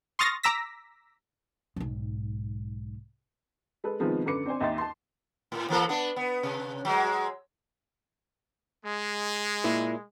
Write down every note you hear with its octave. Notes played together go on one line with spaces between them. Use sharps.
C6 C#6 D#6 F6 A6 A#6
A#5 D6 E6 A#6 B6
B1 G#2
G#3 A4 B4
C3 D#3 F3 G#3 B3
F#2 D3 B4 D6 C#7
C4 D4 C5 G#5
D#2 D#5 E5 G5 C6 A6
A5 C6
A2
E3 A#3 A4
B3 D4
B3
C3
F#3 G#3
G#3
A#2 E4